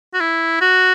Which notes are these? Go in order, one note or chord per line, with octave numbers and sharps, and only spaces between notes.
F#4
E4
F#4